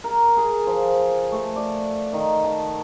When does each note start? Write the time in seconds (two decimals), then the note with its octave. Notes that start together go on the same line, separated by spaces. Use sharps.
0.04 A#4
0.37 G#4
0.67 F3
1.32 A3
1.56 D5
2.13 D#3
2.44 A5